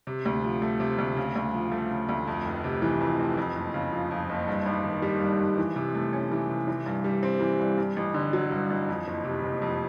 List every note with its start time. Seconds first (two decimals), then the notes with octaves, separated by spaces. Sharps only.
0.07 C3
0.25 D2
0.43 F3
0.62 A3
0.80 C3
0.98 D2
1.17 C#3
1.36 D2
1.54 F3
1.72 A3
1.91 C#3
2.09 D2
2.27 F2
2.45 F1
2.64 C3
2.82 E3
3.01 F2
3.19 F1
3.37 F2
3.56 F#1
3.74 C#3
3.92 F3
4.11 F2
4.29 F#1
4.48 G2
4.66 G#1
4.84 D#3
5.02 G3
5.20 G2
5.40 G#1
5.58 E3
5.76 C3
5.95 A3
6.13 C#4
6.32 E3
6.49 C3
6.68 E3
6.86 G2
7.04 G3
7.23 C4
7.41 E3
7.59 G2
7.78 G2
7.96 A1
8.14 D3
8.33 F#3
8.51 G2
8.70 A1
8.89 F2
9.07 F#1
9.25 C3
9.43 F#1
9.62 F2